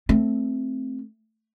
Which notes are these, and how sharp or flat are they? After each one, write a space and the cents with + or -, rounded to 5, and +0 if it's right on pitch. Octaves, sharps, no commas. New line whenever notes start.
A3 +0 C4 +0